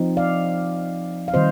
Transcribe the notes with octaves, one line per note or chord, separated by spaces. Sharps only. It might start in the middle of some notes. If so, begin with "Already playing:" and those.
Already playing: F3 C4 D#4
D5 F5
F5
D#3 G3 C4 F4 C5 D#5